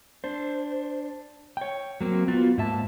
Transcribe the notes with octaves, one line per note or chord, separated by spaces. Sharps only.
D4 C5
C#5 G5
F#3 A#3 C4
B3 F4 F#4
G#2 A#3 E5 A5